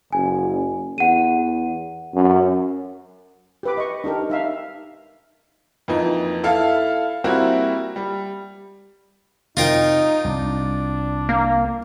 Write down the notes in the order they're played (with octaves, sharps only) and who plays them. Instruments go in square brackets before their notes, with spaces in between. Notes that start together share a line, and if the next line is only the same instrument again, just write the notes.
[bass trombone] F#1 [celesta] G#5
[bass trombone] E2 [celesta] F#5 D#7
[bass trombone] F#2
[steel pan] G4 B4 D6
D#5 C#6
D4 D#4 G4 A#4
D#4 E5 F5
[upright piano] F2 E3 A#3 D#4
E4 A4 F5
G3 A#3 C4 E4 F#4
G3
[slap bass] C3 [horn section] D#4 [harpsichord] F4 A#4 G5
[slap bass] C2 [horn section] D4
[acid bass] A#3